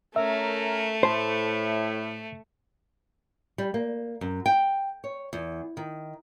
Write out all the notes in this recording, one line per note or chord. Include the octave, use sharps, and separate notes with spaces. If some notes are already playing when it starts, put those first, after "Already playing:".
A3 C#4 A#4 E5
A2 C5 A5
G3
A#3
F#2
G5
C#5
E2
D#3